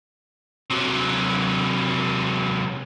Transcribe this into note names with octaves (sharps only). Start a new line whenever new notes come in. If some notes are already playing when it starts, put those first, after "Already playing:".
C3 F#3